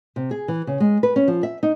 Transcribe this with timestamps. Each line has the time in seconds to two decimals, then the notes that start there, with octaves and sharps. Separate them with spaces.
0.16 C3
0.31 G#4
0.48 E3
0.67 C#3
0.80 G#3
1.03 B4
1.16 C#4
1.28 F3
1.43 E5
1.63 D#4